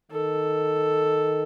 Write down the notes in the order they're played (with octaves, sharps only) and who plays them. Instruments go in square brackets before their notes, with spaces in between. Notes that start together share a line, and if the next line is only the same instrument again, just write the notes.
[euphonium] D#3 [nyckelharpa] A4